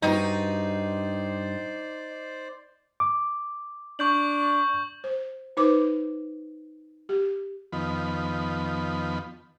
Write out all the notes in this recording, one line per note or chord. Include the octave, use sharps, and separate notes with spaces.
G2 D#4 F#4 C5 D5
D6
D4 C#6 G6 F#7
C5
D#4 B4 C5 D6
G4
F2 D#3 F3 B3 B5